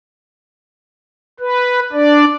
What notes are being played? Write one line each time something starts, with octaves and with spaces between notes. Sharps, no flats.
B4
D4 D5